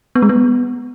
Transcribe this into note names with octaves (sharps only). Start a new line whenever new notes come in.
B3
G#3
B3